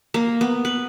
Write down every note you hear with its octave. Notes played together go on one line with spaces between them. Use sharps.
A#3
B3
B4